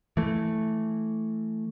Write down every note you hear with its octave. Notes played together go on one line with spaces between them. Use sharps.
E3 A3